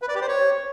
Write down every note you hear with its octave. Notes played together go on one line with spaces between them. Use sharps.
B4
D5
G4
C5
C#5